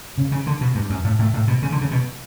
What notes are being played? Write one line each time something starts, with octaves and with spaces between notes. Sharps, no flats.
C#3
C#3
D3
B2
G2
F#2
A2
A2
A2
B2
C#3
D3
C#3
B2